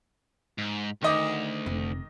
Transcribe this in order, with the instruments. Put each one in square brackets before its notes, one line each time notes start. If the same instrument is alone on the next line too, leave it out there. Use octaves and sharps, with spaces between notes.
[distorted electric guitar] G#2
[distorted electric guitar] D2 [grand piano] D#3 D#5 D6
[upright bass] F1